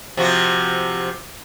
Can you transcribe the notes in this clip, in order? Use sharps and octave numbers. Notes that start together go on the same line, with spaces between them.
C3 F3 F#4